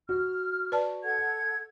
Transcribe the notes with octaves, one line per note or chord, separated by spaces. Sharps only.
F#4 F6
B4 D5 A5
A4 F#5 G#6